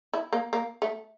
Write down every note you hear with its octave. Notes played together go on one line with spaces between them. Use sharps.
E4
A#3
A#3
A3